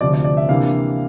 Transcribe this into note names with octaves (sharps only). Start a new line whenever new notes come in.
D2 C3 F3 D5
D5
D5
E5
C3 E3 A#3 D4 F5